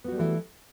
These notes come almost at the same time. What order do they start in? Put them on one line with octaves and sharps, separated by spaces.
B3 F#4 G3 A3 E3